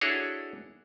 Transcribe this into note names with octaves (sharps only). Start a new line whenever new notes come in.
D4 E4 F#4 G#4 A4 C#5